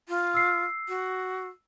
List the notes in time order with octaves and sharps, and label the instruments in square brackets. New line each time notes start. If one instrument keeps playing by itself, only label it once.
[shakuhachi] F4
[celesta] E6 C7
[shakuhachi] F#4